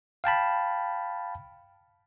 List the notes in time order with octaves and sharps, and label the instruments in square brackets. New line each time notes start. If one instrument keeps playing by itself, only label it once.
[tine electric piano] F5 G5 A5 B5